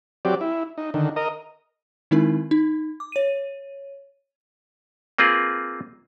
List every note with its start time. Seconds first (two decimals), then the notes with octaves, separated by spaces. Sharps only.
0.25 F#3 C4 G4 D5
0.41 E4
0.78 D#4
0.94 D3 D#3
1.16 A#4 D#5
2.11 D#3 G#3 C4 D#4 E4 A#4
2.51 D#4
3.00 D6
3.12 C#5 D#7
5.18 A#3 C4 F4 G#4 B4